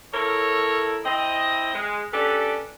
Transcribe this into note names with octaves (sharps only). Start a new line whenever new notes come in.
E4 A4 A#4 C#5
C4 E4 D#5
G#3
C#4 D4 G4 A4 B4